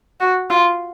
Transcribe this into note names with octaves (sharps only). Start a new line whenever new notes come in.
F#4
F4